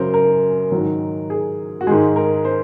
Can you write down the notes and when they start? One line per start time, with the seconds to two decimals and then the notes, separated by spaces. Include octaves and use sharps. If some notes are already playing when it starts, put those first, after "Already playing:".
Already playing: F#2 C#3 F#3 A#4 C5
0.14 A#4
0.72 G#2 D#3 F#3
1.30 G#4
1.81 F#4
1.87 G#2 D#3 G#3 G#4
2.16 A#4
2.45 C5